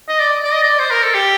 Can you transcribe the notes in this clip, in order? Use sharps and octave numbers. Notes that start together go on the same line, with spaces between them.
D#5
D5
D5
D#5
D5
C5
A#4
A4
G4